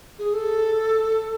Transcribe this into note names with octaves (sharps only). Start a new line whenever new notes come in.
G#4
A4